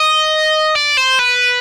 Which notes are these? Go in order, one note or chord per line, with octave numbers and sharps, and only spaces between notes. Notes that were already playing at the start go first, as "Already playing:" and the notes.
Already playing: D#5
D5
C5
B4